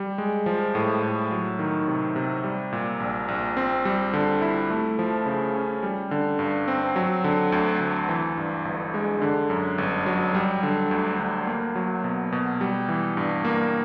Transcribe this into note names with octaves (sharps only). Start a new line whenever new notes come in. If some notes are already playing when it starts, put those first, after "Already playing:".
Already playing: G3
G#3
F3
A2
A2
F#3
D#3
C3
C3
G3
A#2
A#1
A#1
C4
G3
D3
E4
A3
F3
C#3
C#4
G3
D3
G2
C4
F#3
D3
D2
D2
E3
G2
G1
G#3
D3
F#2
G1
F#3
G3
D3
D2
D2
A#3
F#3
B2
B2
G3
E3
G2
A#3